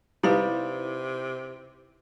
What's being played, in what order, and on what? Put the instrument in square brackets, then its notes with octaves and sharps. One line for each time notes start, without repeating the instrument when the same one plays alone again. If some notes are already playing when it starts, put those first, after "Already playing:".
[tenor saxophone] C3 [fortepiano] G3 [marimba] D#4 F5 [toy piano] E4 B4